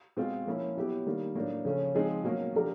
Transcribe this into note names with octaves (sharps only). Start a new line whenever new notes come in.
B2 G#3 C4 F4
F3 A#3 C#4 E4
B2 F#3 B3 E4 G4
D#3 G3 A#3
A2 F#3 A#3 D4
C#3 F3 A3 C#4
F3 G#3 C4 D#4 G#4
B2 F#3 A#3 C#4
F3 A3 D4 G4 A#4